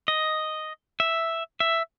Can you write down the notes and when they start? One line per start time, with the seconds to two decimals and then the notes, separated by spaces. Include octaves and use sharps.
0.08 D#5
1.00 E5
1.60 E5